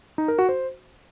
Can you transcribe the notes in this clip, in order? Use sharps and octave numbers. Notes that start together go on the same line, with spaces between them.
D#4
A#4
F#4
C5